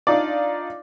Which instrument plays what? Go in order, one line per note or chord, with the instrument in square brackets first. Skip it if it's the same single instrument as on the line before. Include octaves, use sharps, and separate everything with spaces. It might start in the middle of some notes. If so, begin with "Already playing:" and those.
[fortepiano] D4 D#4 F4 D5